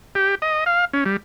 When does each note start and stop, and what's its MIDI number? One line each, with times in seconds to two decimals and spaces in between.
0.15 0.35 67
0.42 0.64 75
0.66 0.85 77
0.93 1.04 61
1.06 1.17 55